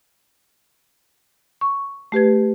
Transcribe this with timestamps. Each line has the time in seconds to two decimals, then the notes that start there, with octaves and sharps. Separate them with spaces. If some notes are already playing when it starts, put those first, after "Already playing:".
1.61 C#6
2.12 A3 G4 B4 G#6